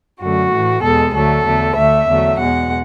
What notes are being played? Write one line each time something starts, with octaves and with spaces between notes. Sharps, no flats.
F#2 D3 A3 F#4
A2 E3 A3
E2 B2 G#3 A4
D2 D3 F#3 A3 A4
E2 D3 A3
D2 D3 A3 E5
E2 D3 F#3 A3
E2 B2 G#3 F#5